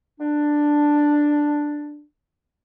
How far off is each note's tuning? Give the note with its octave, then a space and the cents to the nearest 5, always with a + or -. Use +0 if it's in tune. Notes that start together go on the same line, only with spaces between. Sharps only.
D4 +5